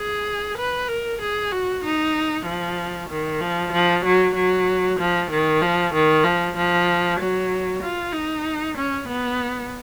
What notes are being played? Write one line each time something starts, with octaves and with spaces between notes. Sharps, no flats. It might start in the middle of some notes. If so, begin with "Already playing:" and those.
Already playing: G#4
B4
A#4
G#4
F#4
D#4
F3
D#3
F3
F3
F#3
F#3
F3
D#3
F3
D#3
F3
F3
F#3
F4
D#4
C#4
B3